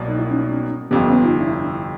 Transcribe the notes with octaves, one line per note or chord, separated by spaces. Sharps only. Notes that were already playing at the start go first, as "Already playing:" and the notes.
Already playing: C2 B2 F#3 A#3
D#4
E4
C#4 D#4
G1 F2 C3 B3 C#4
B3 C#4
D#4 F4
D4 E4